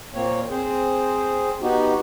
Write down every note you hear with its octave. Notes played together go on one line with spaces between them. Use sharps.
A#2 A#3 C4 C#5
C4 G#4 C5
B3 D#4 F#4 G4